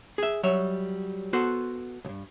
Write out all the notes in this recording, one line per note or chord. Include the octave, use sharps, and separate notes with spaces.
G#4 E5
F#3 G3 C#5 E5
B3 F#4 A4 C5
B1 G2